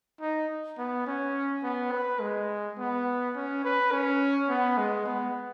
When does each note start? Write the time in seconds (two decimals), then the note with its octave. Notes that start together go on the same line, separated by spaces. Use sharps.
0.21 D#4
0.78 B3
1.07 C#4
1.63 B3
1.92 B4
2.20 G#3
2.78 B3
3.36 C#4
3.64 B4
3.92 C#4
4.49 B3
4.78 G#3
5.06 B3